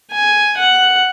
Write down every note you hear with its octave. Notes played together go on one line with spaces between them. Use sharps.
G#5
F#5